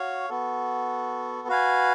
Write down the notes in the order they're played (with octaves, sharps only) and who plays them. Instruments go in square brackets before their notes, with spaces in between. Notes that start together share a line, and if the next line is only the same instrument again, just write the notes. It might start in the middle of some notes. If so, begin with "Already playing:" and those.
Already playing: [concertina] F#4 C#5 F5
B3 F#4 A4
F#4 B4 F5 G#5